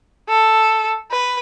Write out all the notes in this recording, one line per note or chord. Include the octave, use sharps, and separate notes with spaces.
A4
B4